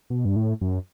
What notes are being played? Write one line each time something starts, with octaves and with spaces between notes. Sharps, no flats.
B2
G2
A2
F#2